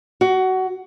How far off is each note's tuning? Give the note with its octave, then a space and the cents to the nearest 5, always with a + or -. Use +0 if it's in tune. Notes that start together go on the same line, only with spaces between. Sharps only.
F#4 +20